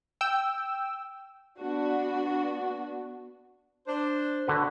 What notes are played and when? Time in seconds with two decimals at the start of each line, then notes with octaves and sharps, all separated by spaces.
0.21 G5 E6
1.58 B3 D4 F#4
3.87 D4 C5
4.47 D3 F#4 B4